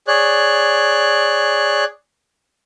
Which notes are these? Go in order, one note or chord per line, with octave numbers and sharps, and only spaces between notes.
G#4 C#5 D5 F#6